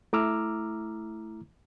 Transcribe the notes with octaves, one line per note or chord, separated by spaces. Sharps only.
A3 E4 A#5 D6 E6 F6